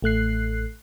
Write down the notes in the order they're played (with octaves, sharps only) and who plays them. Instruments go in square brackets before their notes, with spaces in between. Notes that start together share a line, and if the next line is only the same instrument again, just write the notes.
[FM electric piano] A1 A3 F#6 C7